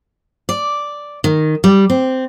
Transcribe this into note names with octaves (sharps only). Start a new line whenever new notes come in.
D5
D#3
G3
C4